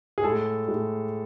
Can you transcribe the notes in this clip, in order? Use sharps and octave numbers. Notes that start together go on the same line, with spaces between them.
G#4
A2 G#3 A4
A2 G#3